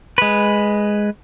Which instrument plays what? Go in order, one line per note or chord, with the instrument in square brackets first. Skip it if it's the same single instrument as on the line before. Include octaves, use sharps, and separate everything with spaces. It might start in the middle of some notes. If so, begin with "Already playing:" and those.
[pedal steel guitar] G#3 B4